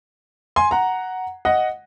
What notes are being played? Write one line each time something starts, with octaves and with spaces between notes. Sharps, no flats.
G#5 C6
F#5 A#5
D#5 F#5